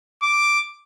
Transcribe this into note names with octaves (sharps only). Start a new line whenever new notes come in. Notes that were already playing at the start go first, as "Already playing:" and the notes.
D6